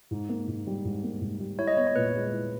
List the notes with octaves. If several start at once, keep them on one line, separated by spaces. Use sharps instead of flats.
G#2
A#3
G#2
G3
G#2
A#3
G#2
G3
E4 C#5
D#5
B3 C#5
C#5
A#2 B4
G#3
E4